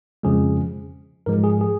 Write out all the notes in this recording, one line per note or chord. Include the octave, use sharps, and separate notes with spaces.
F2 C#3 F3 G#3 G#4
G#2 F3 G#3 A#4
G#4
G#4